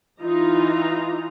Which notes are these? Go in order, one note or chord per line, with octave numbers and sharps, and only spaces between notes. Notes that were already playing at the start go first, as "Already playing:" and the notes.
E3 D#4 F4 A#5